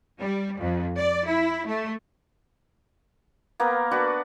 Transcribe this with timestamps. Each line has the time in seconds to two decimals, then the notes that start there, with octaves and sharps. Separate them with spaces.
0.20 G3
0.58 F2
0.98 D5
1.26 E4
1.67 A3
3.60 A#3 B3 A#4
3.91 D4 F#4 B4